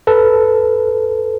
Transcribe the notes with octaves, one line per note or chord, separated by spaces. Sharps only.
A4 B4